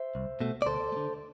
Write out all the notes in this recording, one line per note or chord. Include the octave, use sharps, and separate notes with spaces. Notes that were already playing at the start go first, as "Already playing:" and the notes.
Already playing: C5 E5
C2
B2 A3
D5
D2 A4 C5
A3
D3